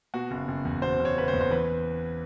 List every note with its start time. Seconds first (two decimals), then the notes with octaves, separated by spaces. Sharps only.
0.14 B2 F#4
0.31 F#1
0.48 F#1
0.65 E2
0.82 B2 C5
0.99 F#1
1.05 C#5
1.17 F#1 B4
1.28 C5
1.34 E2
1.41 C5
1.51 E3 B4